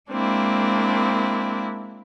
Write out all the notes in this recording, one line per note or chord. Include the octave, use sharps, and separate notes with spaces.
G#3 A#3 C4 D4 E4